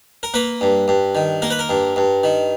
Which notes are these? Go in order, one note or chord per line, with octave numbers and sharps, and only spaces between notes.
A#4
A#3 B4
G2
G2
D#3
A#3 A#4
B4
A#4
G2
G2
D#3